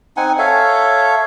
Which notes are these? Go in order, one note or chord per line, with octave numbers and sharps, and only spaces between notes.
C4 D#4 F#5 G#5
A4 C#5 E5 F5